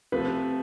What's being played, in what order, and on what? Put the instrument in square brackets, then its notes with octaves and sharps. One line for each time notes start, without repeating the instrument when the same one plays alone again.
[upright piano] C3 F3 A3 [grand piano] B4